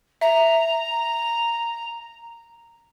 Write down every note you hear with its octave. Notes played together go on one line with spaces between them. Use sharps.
E5 A#5